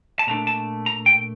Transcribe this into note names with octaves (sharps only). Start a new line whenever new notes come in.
A5
A#2 A3 D4 A#5
A5
A#5
G5